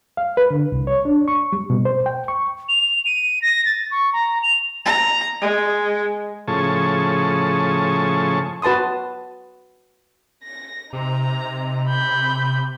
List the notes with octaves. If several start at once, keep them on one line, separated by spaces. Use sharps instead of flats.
F5
B4
D3
C2
C#5
D4
C#6
G3
B2
C5
G5
C#6
F7
D#7
A#6
A6
C#6
A#5
F7
A#5
G#3
A2 C#3 F3 G#4 A5 C#6
F#4 B4 A5 C6 D#6
A#6
C3 D#4 A#5
B5 G6